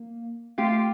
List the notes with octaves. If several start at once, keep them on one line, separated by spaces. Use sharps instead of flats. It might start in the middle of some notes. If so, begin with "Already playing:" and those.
Already playing: A#3
A3 F4 G4